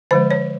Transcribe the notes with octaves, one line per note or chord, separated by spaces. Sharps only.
D3 F3 G#3 C5
C#5